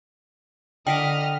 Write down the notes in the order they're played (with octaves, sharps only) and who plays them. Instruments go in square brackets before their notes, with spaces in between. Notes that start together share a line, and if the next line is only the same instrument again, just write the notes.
[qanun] D3 A#4 D6 [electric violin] D#5 F6 [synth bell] G5 B6